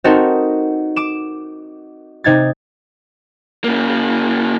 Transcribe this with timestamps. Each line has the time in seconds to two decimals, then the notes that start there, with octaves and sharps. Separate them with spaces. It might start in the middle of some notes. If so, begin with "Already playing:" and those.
0.04 C4 D#4 F#4 A4 A#4
0.96 D6 E7
2.24 C3 D#4 G#6 A6
3.64 C#3 A#3